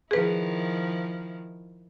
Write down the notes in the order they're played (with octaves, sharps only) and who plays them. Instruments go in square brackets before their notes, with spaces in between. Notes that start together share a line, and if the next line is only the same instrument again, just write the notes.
[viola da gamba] D#3 F3 E4 [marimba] G#4 B4